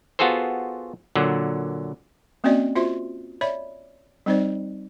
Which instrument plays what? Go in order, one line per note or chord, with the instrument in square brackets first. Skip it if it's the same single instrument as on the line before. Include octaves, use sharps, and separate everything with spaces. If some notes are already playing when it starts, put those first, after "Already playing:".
[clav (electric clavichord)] B3 F4 F#4 G#4 A4 C5
A#2 D3 F#3
[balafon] A#3 C4 C#4 F#4 D5 D#5
F4 F#4 C5 E5
C#5 D5 E5 B5
G3 C4 D#4 C5 D5